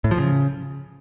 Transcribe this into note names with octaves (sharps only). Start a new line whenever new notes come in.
A2
F3
C#3